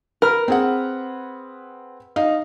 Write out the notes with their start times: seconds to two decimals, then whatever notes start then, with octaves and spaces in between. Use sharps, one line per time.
0.22 A#4 B4 F6
0.48 C4 G#4 F#5
2.16 D#4 F5